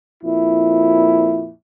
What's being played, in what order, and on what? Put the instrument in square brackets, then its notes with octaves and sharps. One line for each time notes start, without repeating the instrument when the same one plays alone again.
[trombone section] F2 A#2 E4